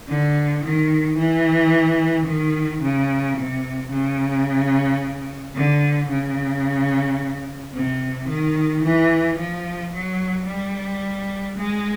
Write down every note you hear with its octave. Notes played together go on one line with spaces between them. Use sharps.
D3
D#3
E3
D#3
C#3
C3
C#3
D3
C#3
C3
D#3
E3
F3
F#3
G3
G#3